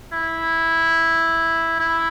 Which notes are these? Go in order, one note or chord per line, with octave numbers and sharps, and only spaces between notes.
E4
E4